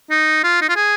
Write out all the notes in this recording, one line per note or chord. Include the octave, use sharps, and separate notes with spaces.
D#4
F4
D#4
F4
G#4